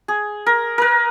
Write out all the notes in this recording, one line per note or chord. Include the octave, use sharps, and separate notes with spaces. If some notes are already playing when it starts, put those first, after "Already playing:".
G#4
A#4
A#4 B4